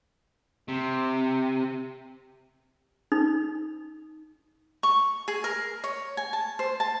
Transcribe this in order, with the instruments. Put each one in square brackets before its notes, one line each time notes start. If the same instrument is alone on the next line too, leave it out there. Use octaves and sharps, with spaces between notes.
[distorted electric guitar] C3
[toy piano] D#4
[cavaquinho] C#6
G#4
A#4
C#5
G#5
A5
C5
A5